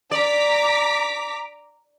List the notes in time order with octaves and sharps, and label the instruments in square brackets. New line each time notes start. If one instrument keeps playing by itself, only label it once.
[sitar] D5 [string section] A#5 D6 B6